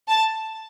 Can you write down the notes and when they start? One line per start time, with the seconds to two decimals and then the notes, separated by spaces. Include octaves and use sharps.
0.09 A5